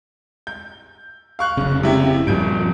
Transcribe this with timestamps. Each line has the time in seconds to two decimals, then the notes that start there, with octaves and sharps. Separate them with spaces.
0.47 G6
1.39 F5 C#6 F#6
1.57 F1 C#3
1.83 C3 E4 G4
2.27 D#1 G2 F3 G6 D7